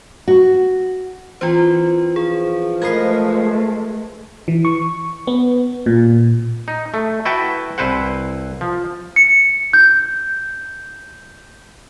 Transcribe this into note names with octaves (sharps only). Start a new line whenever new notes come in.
F#4
E3 C4 F4 C5
F3 G#4
G#3 A3 A#4 B4 D#5 G#6 C7
E3
C#6
B3
A#2
D#4
A3
E4 F#4 B4 E5 G5 A5
C2 E4 B4 C5 F#5
F3
C#7
G6